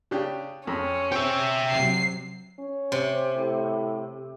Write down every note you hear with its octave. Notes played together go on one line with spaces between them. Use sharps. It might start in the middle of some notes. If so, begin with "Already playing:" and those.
C#3 D4 G4
F2 C#4
C4 G4 E5
C3 F#3 C7
C#4
C3
A2